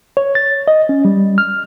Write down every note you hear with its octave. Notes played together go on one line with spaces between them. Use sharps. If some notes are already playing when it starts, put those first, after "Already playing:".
C#5
A6
D#5
C#4
G3
F6